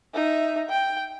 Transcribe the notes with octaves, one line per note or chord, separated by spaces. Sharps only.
D#4 E5
G5